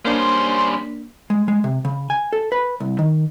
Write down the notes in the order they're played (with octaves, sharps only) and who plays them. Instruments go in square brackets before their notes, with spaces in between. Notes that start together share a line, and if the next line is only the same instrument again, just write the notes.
[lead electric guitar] G3 C#4 [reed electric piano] A#3 D4 [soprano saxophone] C5 [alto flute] C6
[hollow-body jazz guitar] G#3
G#3
C3
C#3
G#5
A4
B4
C2
D#3